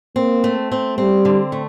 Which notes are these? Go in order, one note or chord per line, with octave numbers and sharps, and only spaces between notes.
A#3 C4
A3
C4
G3 C4
D3
A3